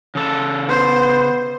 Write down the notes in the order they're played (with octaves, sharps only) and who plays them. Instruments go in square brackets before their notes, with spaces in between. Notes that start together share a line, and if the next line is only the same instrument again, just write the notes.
[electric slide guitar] C#3 A4
[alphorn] B3 [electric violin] C5